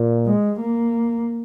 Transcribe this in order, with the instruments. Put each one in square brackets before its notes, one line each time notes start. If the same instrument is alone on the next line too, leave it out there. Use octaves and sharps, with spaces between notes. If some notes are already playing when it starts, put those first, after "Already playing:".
Already playing: [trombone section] A#2
[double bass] G#3
A#3